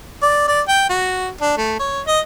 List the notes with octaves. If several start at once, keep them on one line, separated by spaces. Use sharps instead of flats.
D5
D5
G5
F#4
D4
A3
C#5
D#5